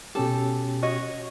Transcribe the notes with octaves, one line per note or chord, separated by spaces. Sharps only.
B2 C#4 G4 A4
F#4 C#5 D#5